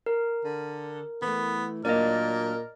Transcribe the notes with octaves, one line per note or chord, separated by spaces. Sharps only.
A#4
D3
E3 A3 B3
A#2 F#3 A#3 D4 A#4 D5 D#5